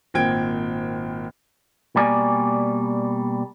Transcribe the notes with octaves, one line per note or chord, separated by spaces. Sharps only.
G#1 A#2 C4 G5 G#6 D7
B2 G3 A#3 D5 G#5